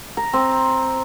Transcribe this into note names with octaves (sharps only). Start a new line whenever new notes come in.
A#5
C4